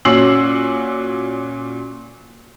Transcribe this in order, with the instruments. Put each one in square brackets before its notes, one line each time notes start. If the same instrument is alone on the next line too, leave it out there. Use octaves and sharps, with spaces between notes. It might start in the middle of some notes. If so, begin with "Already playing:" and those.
[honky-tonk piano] A#2 C#4 F#4 E6 C7 F#7